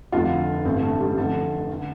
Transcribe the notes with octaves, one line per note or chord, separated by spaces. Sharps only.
F1 F2 D3 F4
A1 G2 D3 C4
A3
G3
F1 F2 D3 A4
D3